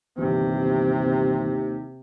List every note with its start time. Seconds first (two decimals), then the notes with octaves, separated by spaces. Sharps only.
0.18 G1 D#2 C3 E3